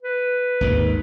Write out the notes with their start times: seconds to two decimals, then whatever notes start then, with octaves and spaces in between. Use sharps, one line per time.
0.03 B4
0.61 G#1 D#2 D#3